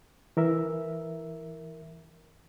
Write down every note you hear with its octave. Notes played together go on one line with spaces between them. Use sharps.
E3 A#4 E5